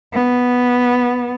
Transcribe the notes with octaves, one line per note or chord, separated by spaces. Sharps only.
B3